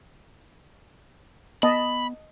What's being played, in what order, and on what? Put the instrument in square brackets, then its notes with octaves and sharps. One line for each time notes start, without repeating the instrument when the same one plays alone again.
[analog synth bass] B3 [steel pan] D#5 A5 [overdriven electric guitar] B5